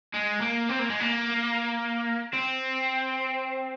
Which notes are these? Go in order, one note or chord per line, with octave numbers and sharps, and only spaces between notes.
G#3
A#3
C4
A#3
G#3
A#3
C4